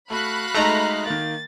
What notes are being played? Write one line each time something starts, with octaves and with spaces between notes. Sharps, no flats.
A3 F#4 F5 B5 F#6
G#3 A3 D#4 D#5 A#5
D#3 A#3 A6